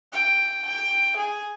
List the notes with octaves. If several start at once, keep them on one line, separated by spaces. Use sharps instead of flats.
G5
G5
G#4